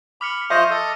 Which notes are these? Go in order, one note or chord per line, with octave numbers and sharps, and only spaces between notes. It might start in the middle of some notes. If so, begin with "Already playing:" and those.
B5 D6 F6 C#7
F4 C5 D#5 E5 C6 C#6
A4 D#5